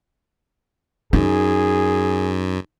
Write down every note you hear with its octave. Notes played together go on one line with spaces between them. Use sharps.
F#2 D#4 G#4